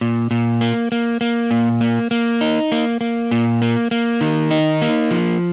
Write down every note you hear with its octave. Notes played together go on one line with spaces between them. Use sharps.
A#2
A#2
A#3
A#3
A#3
A#2
A#3
A#3
D#4
A#3
A#3
A#2
A#3
A#3
D#3
D#4
A#3
F3